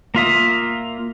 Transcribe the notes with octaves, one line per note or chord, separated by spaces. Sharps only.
A#3 F4 E5 D#6